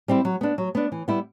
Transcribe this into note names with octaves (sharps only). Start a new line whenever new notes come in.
G3 C4 E4
F#3
B3 D4
F#3
B3 D4
E3
G3 B3 E4